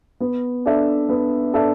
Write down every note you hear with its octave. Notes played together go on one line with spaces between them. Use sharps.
B3
D4 A4 E5
B3
D4 A4 E5